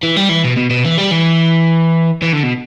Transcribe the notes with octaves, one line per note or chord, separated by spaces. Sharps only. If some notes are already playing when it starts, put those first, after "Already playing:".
E3
G3
E3
B2
B2
B2
E3
G3
E3
E3
D3
B2